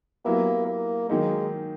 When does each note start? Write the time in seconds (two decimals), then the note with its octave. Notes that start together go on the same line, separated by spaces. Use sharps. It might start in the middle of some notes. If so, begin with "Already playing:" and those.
0.24 F#3 A#3 B3 E4 G4 B4
0.67 A#3
1.09 D#3 F#3 G#3 A#3 D#4